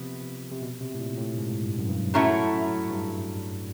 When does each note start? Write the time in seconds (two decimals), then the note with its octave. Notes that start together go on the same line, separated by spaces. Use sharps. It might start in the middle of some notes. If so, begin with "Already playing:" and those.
Already playing: C3 F3 B3 G4
0.52 C3
0.62 B2
0.81 C3
0.94 A2
1.00 A#2
1.18 A2
1.37 G#2
1.63 G2
1.79 F#2
1.89 G2
2.14 A2 F#3 A3 C#4 E4
2.90 G2